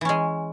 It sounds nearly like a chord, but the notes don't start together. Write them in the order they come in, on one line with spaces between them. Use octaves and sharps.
E3 C#4 G#3